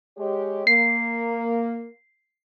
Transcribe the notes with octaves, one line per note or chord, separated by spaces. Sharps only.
G#3 G4 C#5
A#3 C7